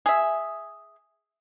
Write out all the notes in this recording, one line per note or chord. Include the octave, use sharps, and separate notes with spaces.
G#4 E5